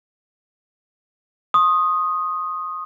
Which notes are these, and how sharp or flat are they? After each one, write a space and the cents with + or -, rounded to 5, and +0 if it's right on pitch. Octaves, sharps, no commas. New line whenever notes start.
C6 +45 D#6 +0